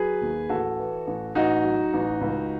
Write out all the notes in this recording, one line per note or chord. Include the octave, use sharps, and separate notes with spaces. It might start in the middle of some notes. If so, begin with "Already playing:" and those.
Already playing: F#3 G#4 B4
D#2
A1 F#4 A4
E3
A1
A1 D#4 F#4
F#3
A1
C#2